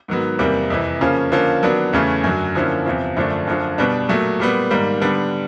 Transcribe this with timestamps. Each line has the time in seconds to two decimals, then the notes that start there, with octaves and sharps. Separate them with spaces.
0.08 G#2 D#3 F#3 B3
0.39 E2 C3 D#3 G3 A#3
0.70 F2 C3 E3
1.01 C#3 F3 A#3 C#4
1.32 D3 F3 A#3 C#4
1.63 D#3 F#3 B3 D4
1.93 E2 C#3 E3 A3 C#4
2.24 F#2 D3 F#3
2.55 D3 F3 A#3 C#4 E4
2.86 E2 C3 F3
3.17 F#2 D3 F3 A3 D4
3.47 F#2 D3 F3
3.78 B2 G3 B3 D4
4.09 A#2 F#3 A3
4.40 A#2 G3 B3
4.71 G#2 D#3 G3 A#3
5.01 D3 G3 B3 D4